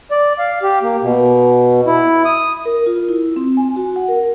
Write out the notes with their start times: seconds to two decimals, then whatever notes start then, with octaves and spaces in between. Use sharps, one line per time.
0.11 D5
0.39 F5
0.63 G4
0.82 A#3
1.02 B2
1.86 E4
2.25 D#6
2.65 A#4
2.86 F4
3.09 E4
3.36 C4
3.57 G#5
3.76 F#4
3.96 F#5
4.08 A#4